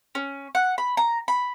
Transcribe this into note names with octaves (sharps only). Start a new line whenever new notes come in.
C#4
F#5
B5
A#5
B5